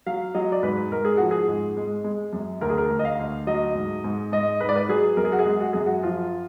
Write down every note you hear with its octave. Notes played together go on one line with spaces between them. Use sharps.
F#3 F5
F#3 D#5
D5
G#2 B4
G#2 A#4
G#4
F3 F#4
G#4
G#2
G#3
G#3
F#2
D2 A#4
G#4
A#4
D2
D#5
F5
D2
F#3 D#5
G#2
G#2
G#2 D#5
G#2 B4
D5
B4
F#3 G#4
F#2 A#4
G#4
F#4
G#4
G#3
F#4
F#2 G#4
F#4
F3 F4